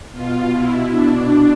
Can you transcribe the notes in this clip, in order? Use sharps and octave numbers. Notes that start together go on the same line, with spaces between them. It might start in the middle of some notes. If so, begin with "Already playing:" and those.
B2 F4
B2 E4
B2 D4